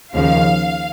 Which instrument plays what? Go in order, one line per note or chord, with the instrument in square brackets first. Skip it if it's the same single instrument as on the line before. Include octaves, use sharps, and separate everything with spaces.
[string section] D#2 C#3 F3 F5